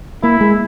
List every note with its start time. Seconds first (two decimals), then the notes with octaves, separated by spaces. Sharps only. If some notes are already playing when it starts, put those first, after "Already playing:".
0.23 A#3 E4
0.41 G#3